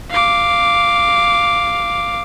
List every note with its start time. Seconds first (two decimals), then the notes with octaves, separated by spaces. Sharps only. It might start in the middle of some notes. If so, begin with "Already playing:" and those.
0.10 F5 D6